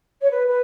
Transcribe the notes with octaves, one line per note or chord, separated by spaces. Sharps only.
C#5
B4
B4